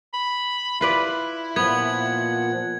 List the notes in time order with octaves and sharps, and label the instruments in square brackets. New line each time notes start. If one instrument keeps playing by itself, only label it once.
[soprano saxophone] B5
[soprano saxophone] E4 [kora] F4 B4 D5
[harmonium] A#2 F3 F#5 [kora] B3 [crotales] G#6